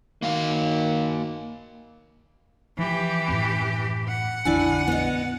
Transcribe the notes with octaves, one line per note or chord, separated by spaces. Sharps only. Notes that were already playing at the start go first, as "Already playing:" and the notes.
D#3 A#3 F#4 F5
E3 F3 G4
F#2 A2 C4
F#5
A#1 F2 D3 D4 E4 G#5
B3 D#5